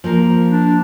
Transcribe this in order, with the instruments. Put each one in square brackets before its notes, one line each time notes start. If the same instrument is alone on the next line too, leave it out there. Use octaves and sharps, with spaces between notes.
[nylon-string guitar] F3 A#3 A#4
[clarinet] D4